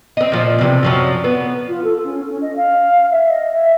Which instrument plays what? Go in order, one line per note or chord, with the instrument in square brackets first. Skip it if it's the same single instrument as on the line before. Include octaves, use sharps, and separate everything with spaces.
[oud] C4 D#5
A#2 F3
E2 C3
F#2 F3 F#3
B3
[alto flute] F4
A4
C#4
C#4
D#5
F5
E5
D#5
E5